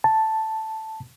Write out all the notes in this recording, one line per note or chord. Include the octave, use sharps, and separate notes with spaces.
A5